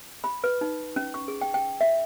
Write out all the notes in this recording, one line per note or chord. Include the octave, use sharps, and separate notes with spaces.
B5
B4
D#4
C#4
C#6
G#4
G5
G5
E5